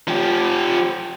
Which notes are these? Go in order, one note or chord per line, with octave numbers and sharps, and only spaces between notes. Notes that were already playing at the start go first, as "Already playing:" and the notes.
F3 G4